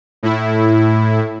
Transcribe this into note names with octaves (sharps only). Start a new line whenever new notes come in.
A2 E4